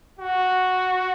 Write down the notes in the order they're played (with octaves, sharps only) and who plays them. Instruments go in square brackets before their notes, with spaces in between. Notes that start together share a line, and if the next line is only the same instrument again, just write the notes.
[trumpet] F#4